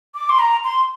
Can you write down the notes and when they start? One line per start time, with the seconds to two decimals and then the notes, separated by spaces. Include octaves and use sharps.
0.15 D6
0.29 C6
0.39 A#5
0.64 C6